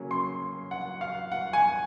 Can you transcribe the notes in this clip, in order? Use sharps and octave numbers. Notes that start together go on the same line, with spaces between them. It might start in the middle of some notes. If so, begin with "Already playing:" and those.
Already playing: C#3 F#3 A#3 C#4
C6
F#5
F5
F#5
G#5